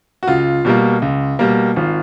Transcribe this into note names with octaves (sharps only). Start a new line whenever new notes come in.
F#4
C#2 F4
B2 G3 A#3
C#2
B2 G3 A#3
G#1 F4